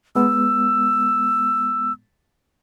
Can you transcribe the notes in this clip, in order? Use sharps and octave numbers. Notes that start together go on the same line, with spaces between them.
G#3 B3 E6